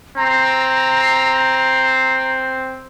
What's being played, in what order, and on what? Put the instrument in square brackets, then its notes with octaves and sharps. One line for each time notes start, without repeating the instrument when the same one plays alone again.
[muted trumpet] C4 [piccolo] A#5